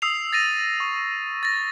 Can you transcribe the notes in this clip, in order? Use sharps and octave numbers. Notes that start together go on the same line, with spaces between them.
D#6 E6 C7 F7
A6 A#6 D#7
C#6
A6 A#6